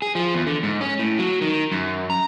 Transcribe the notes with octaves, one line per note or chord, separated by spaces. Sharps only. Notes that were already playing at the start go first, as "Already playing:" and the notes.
G#4
F3
E2
D3
G#2
C#4
A2
F#3
D#3
F#2
A#5